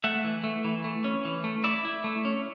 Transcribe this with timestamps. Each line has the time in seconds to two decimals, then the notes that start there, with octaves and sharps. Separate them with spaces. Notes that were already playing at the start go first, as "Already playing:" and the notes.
0.04 A3 E5 F#5
0.24 E3
0.44 A3
0.64 E3
0.84 A3
1.04 C#4
1.25 E3
1.44 A3
1.64 E4 D5 E5
1.85 E4
2.04 A3
2.25 C#4